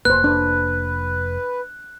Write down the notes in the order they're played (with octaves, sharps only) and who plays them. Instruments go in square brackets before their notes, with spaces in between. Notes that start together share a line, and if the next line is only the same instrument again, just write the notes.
[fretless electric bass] F1 D#2 A#3 [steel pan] B4 C5 [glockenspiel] F#6
[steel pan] D4 [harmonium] B4